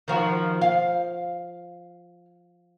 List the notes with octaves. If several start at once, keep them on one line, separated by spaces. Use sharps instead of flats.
D#3 F3 F#4
F5